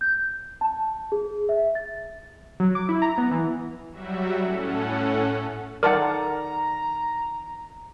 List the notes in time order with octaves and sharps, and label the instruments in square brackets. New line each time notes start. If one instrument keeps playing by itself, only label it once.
[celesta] G6
A5
G#4
E5
A6
[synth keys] F#3
D6
E4
A#5
B3
E3
[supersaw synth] F#3 G3 F#4 E5
A2 C#4 A4 F#5
[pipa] D#3 A4 D5 [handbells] A#4 F#5 [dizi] A#5